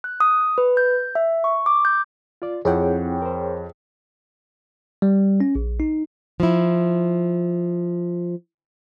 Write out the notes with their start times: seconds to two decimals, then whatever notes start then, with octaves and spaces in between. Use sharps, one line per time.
0.04 F#6
0.20 D#6
0.58 B4
0.77 G6
1.15 E5
1.44 C#6
1.66 D6
1.85 G6
2.42 F4 D5
2.65 F2 C4 E4 G#4 C#5 F#5 G5
3.22 A#4 C5
5.02 G3
5.40 C#4
5.55 A#1
5.80 D#4
6.40 F3 E4